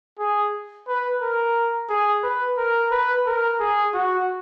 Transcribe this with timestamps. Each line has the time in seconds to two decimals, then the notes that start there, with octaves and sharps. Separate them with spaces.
0.19 G#4
0.88 B4
1.21 A#4
1.89 G#4
2.23 B4
2.57 A#4
2.91 B4
3.26 A#4
3.60 G#4
3.94 F#4